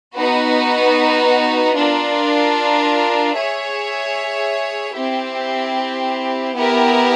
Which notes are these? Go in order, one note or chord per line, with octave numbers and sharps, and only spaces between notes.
B3 D#4 F#4 B4
D4 F4 A#4
G#4 C#5 E5
C4 E4 G4
B3 E4 G4 A#4